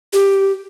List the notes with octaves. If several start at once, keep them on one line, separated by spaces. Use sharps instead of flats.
G4